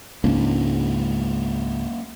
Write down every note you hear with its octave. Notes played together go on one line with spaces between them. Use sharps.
C#2 G#2 A#3 C#4 D4